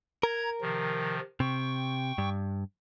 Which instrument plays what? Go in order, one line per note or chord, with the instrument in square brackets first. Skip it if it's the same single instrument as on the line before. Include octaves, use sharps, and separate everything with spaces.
[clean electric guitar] A#4 [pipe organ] A#5 G#6
[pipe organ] C3 D#3 F3
[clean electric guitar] C3 [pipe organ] G5 C#6
[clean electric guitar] G2